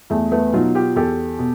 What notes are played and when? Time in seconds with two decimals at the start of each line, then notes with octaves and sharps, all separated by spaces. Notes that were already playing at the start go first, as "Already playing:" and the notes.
0.10 E2 A3
0.31 A3 B3
0.53 B2 F#3 D#4 F4
0.74 F4 G4
0.96 E2 G4 A4
1.39 B2